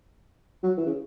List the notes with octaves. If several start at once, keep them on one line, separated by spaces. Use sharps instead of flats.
F#3
E3
C#3